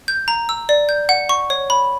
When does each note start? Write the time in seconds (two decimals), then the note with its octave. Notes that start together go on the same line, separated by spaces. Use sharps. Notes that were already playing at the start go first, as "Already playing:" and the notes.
0.08 G6
0.28 A#5
0.49 E6
0.69 D5
0.89 G6
1.09 F#5
1.29 C#6
1.50 C#5
1.70 B5